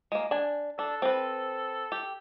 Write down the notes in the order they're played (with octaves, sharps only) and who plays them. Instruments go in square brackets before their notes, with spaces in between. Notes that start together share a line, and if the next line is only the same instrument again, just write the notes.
[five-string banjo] G#3 A#3
D4 G#5
[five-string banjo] D4 [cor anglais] A4
[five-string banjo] C4 B4
G4